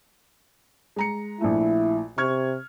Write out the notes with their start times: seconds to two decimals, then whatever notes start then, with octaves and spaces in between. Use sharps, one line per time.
0.96 G#3 A#5 C#7
1.41 A#1 A3 E4
2.18 C3 C#6 F6 G#6